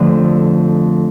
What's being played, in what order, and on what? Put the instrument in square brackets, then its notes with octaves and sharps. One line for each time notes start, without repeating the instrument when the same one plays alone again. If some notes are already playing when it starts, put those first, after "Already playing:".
Already playing: [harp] F2 D3 F3 A3